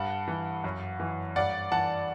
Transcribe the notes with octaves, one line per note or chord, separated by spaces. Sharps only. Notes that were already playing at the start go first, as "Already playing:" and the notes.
Already playing: G2 F#5 A5
E3
F#2
E3
G2 D5 F#5
E3 F#5 A5